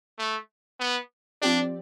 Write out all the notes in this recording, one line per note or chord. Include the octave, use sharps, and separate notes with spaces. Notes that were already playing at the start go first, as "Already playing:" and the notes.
A3
B3
F3 C4 D4 G4 D5